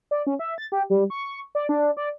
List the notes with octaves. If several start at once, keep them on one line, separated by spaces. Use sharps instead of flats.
D5
C#4
E5
A6
G4
G3
C#6
D5
D4
D5